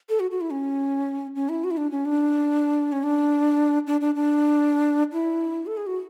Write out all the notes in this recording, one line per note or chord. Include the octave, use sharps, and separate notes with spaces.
A4
F#4
F#4
E4
C#4
C#4
E4
F#4
E4
D4
C#4
D4
C#4
D4
D4
D4
D4
E4
A4
G#4
F#4